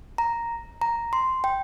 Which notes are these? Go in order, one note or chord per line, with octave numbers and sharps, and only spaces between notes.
A#5
A#5
C6
G5